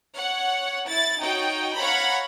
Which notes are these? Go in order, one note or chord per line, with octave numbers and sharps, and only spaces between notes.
C#5 F#5
E4 A6
D#4 F#4 C#5 G5
C#5 F5 F#5 A#5 B5